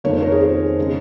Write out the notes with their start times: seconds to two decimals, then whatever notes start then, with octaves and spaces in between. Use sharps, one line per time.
0.04 F2 D#3 A#3 C#5
0.13 C5
0.22 A#4
0.32 G#4
0.41 C5
0.78 C#3 G#3